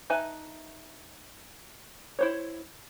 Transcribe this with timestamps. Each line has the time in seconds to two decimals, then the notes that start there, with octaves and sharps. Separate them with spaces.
0.10 D#4 B4 E5 G#5 A5
2.19 E4 C5 C#5